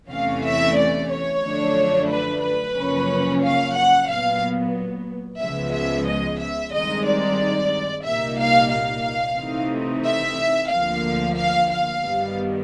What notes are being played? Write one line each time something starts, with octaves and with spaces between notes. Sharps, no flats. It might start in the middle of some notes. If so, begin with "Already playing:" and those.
E2 C3 E3 A3 C#4 F5
E5
D5
C#5
F#2 D3 F3 A3 D4
B4
B4
F#2 C#3 F3 A#3 C#4
F5
F#5
A#2 F#3 B3 F5
C#2 C#3 F3 G#3 B3 E5
E5
D#5
E5
G2 D#3 G#3 C4 D#4 D#5
D5
C2 A#2 G3 A#3 D#4 E5
F5
F5
C3 E3 A3 C4 D#4
E5
D2 D3 F3 A#3 F5
F5
F5
G2 D#3 G3 B3